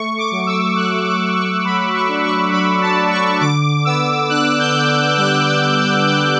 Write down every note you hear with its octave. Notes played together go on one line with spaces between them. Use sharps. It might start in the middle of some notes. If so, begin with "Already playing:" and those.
Already playing: A3 C#6
D6
F#3
E6
F#3 F#6
D6
A3
C#6
F#3 B5
C#6
D4
C#6
F#3 B5
A5
D4
C#6
D3 D6
B3 E6
D4 F#6
G6
D3
G3 F#6
E6
D3
E6
G3 E6